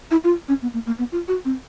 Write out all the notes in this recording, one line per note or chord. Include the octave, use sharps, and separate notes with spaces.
E4
F4
C#4
B3
A#3
A#3
B3
F4
F#4
C4